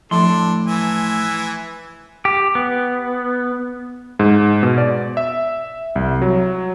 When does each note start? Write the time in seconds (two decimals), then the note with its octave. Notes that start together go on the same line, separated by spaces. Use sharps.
0.11 A2 F3 D4 A4 C6
0.67 E3 E5 G#5
2.25 G4
2.55 B3
4.19 G#2
4.63 B2
4.78 D5
5.17 E5
5.96 C2
6.22 F#3